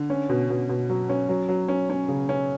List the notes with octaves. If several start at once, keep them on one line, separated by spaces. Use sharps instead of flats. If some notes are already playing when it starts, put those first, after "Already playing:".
Already playing: D3
C#4
B2
B2
B2
F#3
C#4
F#3
F#3
C#4
C#4
C#3
C#4